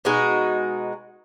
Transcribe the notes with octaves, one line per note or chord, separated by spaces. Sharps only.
B2 G#3 D#4 F#4